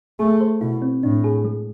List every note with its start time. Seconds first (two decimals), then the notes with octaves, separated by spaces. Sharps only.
0.19 A3 G#4
0.41 C5
0.61 B2 E4
0.82 C4
1.03 A2 D4
1.24 G#4
1.45 G#3